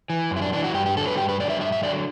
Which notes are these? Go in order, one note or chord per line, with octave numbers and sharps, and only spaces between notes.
E3
F#2
E4
D4
E3 D4
F#4
G2 G4
G4
D3 F#3 A4
B4
G2 G4
B4
D3 F#3 D5
E5
G2 E5
E5
D3 F#3 D5